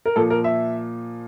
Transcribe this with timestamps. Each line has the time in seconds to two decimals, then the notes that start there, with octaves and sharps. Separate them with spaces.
0.05 A#4
0.16 A#2 F3 A4
0.30 A#4
0.44 E5